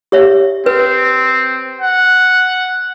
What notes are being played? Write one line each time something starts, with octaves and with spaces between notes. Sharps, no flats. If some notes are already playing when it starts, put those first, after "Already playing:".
G4 C#5 E5
C4 B4
F#5